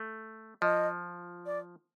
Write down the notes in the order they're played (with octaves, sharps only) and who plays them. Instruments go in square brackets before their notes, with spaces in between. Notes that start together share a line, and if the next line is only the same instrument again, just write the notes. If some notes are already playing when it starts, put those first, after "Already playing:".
Already playing: [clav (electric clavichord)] A3
[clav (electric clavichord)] F3 [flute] D#5
[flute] D5